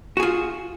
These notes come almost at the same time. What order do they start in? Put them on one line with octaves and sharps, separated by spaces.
F#4 G#4 F4